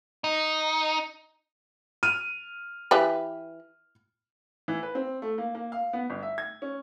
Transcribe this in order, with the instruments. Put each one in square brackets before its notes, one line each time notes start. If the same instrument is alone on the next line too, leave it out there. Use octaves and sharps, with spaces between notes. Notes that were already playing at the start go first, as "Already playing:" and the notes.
[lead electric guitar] D#4
[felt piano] F6 D#7
[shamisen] E3 G4 B4
[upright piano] E3
B4
C4
A3
A#3
A#3
F5
B3
G1
E5
G#6
C#4